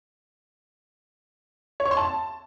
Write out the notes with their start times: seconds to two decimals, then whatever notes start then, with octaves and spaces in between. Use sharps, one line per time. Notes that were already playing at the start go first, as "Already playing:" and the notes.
1.80 C#5
1.85 C#6
1.91 C6
1.97 A5